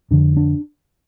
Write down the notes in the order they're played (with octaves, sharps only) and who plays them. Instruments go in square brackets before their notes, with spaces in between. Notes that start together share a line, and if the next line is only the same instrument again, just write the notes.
[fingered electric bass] F2 D3 D4
D4